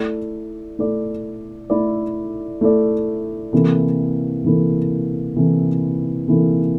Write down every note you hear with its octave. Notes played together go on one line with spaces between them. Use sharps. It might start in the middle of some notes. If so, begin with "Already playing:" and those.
Already playing: A3 E4 A4 D5
A3 E4 A4 D5
A3 E4 A4 D5
A3 E4 A4 D5
C3 E3 A#3 E4 A4
C3 E3 A#3 E4 A4
C3 E3 A#3 E4 A4
C3 E3 A#3 E4 A4